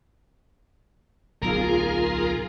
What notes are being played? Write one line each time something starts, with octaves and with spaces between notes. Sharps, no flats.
D1 B1 F4 G#4 A#4